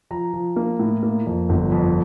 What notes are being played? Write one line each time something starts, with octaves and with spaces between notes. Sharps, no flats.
F3 A#5
F3
A#3
A2
A#3
F2
G1
F2